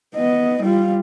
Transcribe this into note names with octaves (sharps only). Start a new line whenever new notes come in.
B3 D#5
G3 F4